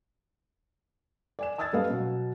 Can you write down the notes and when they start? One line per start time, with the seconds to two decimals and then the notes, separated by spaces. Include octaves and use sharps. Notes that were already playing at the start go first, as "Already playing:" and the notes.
1.39 D5 G#5 E7
1.58 A5 D#6 E6 G#6 A6
1.73 F#2 G3 A3 B4 D#5 F5
1.90 B2 F#3